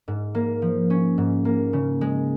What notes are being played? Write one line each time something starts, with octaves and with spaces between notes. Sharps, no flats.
G#2
A#3
F3
C#4
G#2
A#3
C#3
G#3